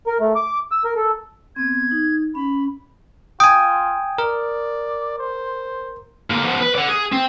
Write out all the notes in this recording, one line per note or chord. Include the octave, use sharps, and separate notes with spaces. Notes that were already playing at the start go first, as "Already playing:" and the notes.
A#4
A3
D6
E6
A#4
A4
B3 C4 G#6
D#4
C#4 B5
F4 G5 G#5 D#6
A#4 D5
C5
D3 A#3
F3 B3
B4
D5 F#5
G#4
C4